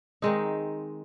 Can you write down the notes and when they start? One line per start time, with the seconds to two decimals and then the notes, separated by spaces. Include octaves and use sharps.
0.22 D#3 G#3 C4 D#4